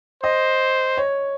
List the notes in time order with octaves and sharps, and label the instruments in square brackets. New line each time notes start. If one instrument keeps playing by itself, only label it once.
[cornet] C5 [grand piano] D#5
[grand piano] C#5